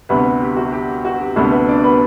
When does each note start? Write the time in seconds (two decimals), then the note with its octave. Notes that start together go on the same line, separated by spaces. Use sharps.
0.09 D2 C3 G3 B3 B4
0.41 G4
0.57 F#4
0.72 G4
0.88 G4
1.05 F#4
1.21 G4
1.36 D2 C3 G3 A3 B3 A4
1.51 B3 B4
1.68 D4 D5
1.84 B3 B4